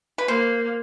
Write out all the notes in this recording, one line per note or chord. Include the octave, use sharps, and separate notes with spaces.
B4
A#3 C5